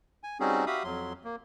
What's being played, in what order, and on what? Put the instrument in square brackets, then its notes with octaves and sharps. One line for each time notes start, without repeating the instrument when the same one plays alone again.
[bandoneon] G#5
G3 C4 C#4 D#4 F#4 G#4
F#4 G4 E5 F5 B5 D#6
F2 F#3 C6
A#3